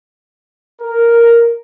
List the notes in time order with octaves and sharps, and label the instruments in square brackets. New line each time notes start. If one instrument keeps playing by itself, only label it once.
[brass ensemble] A#4